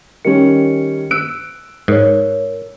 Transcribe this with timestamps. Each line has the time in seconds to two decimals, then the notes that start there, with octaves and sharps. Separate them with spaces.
0.25 D#3 G3 C#4 C#7
1.11 E6 F#6 D7
1.88 G#2 A#4 C#5